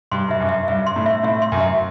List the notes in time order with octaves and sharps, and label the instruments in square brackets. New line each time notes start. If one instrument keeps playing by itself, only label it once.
[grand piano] G2 [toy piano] C6
[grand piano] G2 [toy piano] E5
[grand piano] F#2
[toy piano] E5
[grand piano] G2 [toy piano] E5
[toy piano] C6
[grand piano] A2
[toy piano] E5
[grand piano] A2 [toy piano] E5
[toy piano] C6
[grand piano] F#2
[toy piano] E5